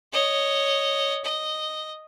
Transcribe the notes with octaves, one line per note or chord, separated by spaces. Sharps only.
C#5 D#5
D#5